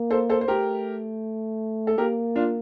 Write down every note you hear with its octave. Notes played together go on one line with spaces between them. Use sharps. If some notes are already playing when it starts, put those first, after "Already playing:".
Already playing: A#3
A4 C5
A4 C5
C5
A3 G4 A#4
A4
A#3 G4 A#4
D4 F4